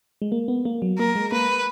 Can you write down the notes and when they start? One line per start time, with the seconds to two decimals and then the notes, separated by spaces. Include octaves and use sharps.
0.22 G#3
0.32 A#3
0.48 B3
0.65 A#3
0.82 F#3
0.99 A#3 A#4
1.16 G#3
1.32 A#3 B4